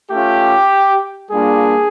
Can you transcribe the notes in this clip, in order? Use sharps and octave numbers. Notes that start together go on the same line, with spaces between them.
A3 C#4 F4 G4
G3 A#3 D4 F4 G#4